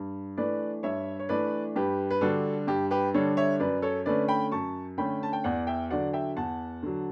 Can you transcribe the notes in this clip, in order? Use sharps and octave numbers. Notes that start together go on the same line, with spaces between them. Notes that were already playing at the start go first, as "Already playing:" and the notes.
Already playing: G2
E3 A3 D4 B4 D5
G2 C#5 E5
C#5
E3 A3 D4 B4 D5
G2 G4 B4
B4
D3 G3 D4 F#4 A4
G2 G4
G4 B4
D3 G3 D4 A4 C#5
C#5 E5
F#2 B4 D5
A4 C#5
D3 A3 C#4 B4 D5
G5 B5
F#2 A5 C#6
D3 A3 C#4 G5 B5
A5
G5
E2 D5 F#5
E5 G5
D3 F#3 D5 F#5
E5 G5
E2 F#5 A5
D3 F#3